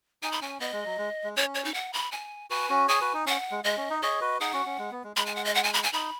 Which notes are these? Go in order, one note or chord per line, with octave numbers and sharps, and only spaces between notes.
D#4 G#5
B5
C#4 G#5
B3 D#5
G#3
F#3
G#3
G#3
C#4 C#5
C#5
D#4
F#5
B5
G#5
F#4 B4 G#5
C#4 F#4
G#4 C#5 G#5
F#4 B4
D#4
C#4 F#5
G#3
G#3 D#5
C#4
D#4
G#4 C#5 D#5
F#4 B4
D#4 G#4 F#5
C#4 F#4
C#4
G#3
B3
G#3
G#3 B5
G#5
F#5
D#5
F#5
G#5
B5
G#5
D#4 B5